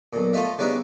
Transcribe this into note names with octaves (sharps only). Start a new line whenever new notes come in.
B1 A#2
F3 A3 F4 D#5 E5
C#3 G3 B3 D4 D#4 E5